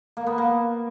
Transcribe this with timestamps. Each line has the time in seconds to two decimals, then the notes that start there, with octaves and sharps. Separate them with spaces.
0.17 A#3
0.27 B3
0.38 A#3